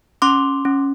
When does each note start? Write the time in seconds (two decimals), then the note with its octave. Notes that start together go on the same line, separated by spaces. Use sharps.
0.22 C#4 C6 D6
0.65 C#4